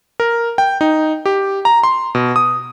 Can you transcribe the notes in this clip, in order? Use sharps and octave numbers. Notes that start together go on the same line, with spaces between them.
A#4
G5
D#4
G4
A#5
C6
B2
D#6